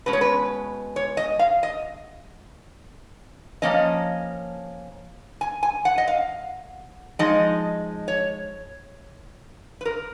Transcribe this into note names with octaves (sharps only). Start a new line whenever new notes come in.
B2 G#3 C#4 B4
C#5
B4
C#5
D#5
F5
D#5
F3 A#3 C#4 D#5
G#5
G#5
F#5
D#5
F5
F3 G#3 D#4 D#5
C#5
B4
A#4